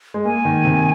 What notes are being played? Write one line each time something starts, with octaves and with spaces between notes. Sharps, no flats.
G#3
A#3 G#5
D#3
C3